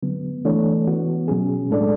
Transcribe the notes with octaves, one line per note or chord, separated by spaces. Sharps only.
D3 F#3 B3
E3 A3 D4 A4 C#5
E3 B3 F#4
B2 F#3 C#4 G#4
A2 G#3 D4 A4 D5